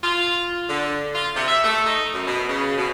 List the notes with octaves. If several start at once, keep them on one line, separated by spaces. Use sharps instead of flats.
F4
D3
F4
C3
E5
A3
D#4
F#2
B2
C#3
B2